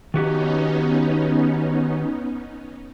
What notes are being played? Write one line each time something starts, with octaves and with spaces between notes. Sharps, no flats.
D#3 B3 C#4 D#4 F#4 G4